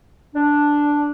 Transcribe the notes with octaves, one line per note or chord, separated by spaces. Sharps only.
D4